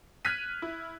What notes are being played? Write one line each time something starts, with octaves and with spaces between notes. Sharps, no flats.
F6 F#6 G#6 B6 D#7
E4